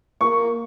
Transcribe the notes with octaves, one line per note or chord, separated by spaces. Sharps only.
A#3 C#6